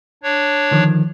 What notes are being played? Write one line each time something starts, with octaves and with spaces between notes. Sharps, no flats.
D4 C#5
D3 D#3 F3